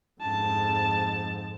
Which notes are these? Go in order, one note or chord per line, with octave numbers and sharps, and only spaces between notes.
F2 G#2 A5